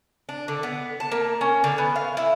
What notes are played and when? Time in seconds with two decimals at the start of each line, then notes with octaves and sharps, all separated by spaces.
0.29 D4
0.48 D3
0.63 B3
1.00 A5
1.12 A#3
1.41 C#4
1.64 D3
1.78 B3
1.96 F5
2.17 E4